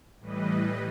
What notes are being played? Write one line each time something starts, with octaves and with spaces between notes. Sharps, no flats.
A2 E3 G3 B4 D#5